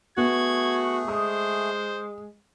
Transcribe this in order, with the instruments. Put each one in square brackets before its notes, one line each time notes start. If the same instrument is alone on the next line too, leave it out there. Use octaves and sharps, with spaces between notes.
[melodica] A3 G#4 [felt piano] B3 [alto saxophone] F#4 [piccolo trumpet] G#6
[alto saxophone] G#3 [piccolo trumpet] C5 [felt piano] D#6